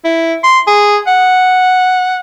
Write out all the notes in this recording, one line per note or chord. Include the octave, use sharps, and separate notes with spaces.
E4
C6
G#4
F#5